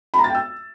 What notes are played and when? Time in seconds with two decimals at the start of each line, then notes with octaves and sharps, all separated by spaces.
0.14 B5
0.19 A#5
0.24 A6
0.29 G5
0.35 E6